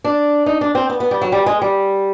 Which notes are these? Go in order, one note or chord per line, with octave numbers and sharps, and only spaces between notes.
D4
D#4
D4
C4
B3
B3
G3
F#3
G3
G#3
G3